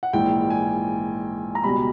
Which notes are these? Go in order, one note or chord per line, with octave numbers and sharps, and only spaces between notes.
F#5
A#1 G#2 E3 G5
G#5
A#5
C#2 B2 G3 B5